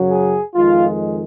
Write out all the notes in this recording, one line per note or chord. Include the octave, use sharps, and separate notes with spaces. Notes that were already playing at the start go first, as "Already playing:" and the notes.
Already playing: F#2 C#3 F#3
G#4
F2 D#3 G#3 F4